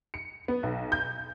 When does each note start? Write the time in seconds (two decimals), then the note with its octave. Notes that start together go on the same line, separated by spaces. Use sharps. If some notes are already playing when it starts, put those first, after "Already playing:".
0.14 C#7
0.48 B3
0.63 B1
0.92 G6